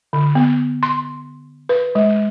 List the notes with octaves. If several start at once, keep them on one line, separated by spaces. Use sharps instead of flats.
D3
B3
C6
B4
G#3